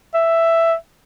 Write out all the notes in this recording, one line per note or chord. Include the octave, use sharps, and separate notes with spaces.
E5